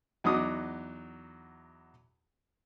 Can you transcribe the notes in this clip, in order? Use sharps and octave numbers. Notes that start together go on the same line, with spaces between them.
E2 F#3 D#4 D6 D#6